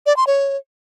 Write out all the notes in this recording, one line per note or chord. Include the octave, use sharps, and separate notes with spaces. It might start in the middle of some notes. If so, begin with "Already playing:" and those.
D5
C6
C#5